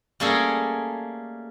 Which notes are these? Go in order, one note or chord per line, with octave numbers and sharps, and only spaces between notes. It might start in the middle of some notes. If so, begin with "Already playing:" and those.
G3 A3 A#3 C#4 G#4 A4